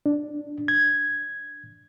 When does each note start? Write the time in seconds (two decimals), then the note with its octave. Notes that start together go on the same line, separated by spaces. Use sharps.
0.06 D4
0.68 G#6